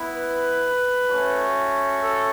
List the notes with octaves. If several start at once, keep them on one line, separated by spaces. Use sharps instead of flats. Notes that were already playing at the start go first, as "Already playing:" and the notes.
Already playing: B3 E4
B4
A3 C#4 F#4
A4